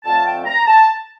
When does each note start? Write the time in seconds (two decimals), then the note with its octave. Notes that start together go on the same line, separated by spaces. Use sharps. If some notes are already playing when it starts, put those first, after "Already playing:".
0.04 F2 D3 A3 C4 F4 A5
0.25 G5
0.45 A#5
0.66 A5